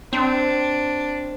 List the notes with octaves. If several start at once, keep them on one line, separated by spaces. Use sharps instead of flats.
C4 D4